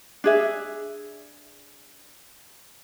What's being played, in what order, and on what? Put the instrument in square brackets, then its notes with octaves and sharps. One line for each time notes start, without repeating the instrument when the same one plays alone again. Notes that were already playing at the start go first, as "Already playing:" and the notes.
[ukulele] D4 G#4 E5